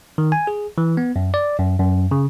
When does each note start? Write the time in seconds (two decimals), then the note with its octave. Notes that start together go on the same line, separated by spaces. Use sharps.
0.18 D#3
0.32 G#5
0.47 G#4
0.78 E3
0.97 B3
1.16 F#2
1.34 D5
1.59 F#2
1.79 F#2
2.11 C#3